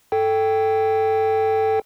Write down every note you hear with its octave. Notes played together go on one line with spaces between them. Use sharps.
A4 G5